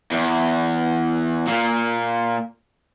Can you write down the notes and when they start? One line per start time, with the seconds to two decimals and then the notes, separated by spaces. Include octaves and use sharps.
0.12 E2
1.47 A#2